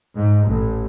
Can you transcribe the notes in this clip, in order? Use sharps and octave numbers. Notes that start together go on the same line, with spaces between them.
G#2
A1